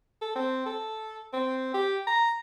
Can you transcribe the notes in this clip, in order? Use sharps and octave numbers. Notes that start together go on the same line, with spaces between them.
A4
C4
A4
C4
G4
A#5